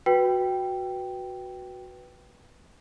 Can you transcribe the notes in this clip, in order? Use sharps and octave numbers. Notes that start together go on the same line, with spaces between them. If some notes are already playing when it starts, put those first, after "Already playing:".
F#4 B4 G5